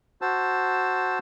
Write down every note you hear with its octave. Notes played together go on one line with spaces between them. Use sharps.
F#4 C5 A5 E6